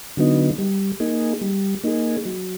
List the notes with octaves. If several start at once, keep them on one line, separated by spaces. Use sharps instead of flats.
D3 F#3 B3 D#4
G3
A#3 D#4 G#4
G3
A#3 D#4 G#4
F#3